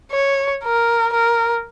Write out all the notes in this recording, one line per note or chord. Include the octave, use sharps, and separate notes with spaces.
C#5
A#4
A#4